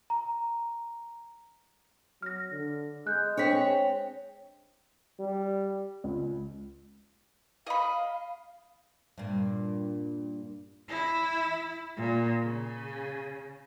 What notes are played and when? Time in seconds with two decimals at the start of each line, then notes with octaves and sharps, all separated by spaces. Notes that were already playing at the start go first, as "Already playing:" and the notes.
0.10 A#5
2.22 F#3 F6 A#6
2.52 D3
3.07 G#3 F#6 G6
3.37 C4 D4 C#5 B6
5.19 G3
6.04 C#2
7.67 D#5 F5 B5
9.18 G2 A#2
10.88 E4
11.97 A#2
12.41 C#3